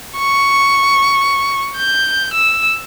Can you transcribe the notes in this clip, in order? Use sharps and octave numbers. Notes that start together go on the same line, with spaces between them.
C#6
G6
E6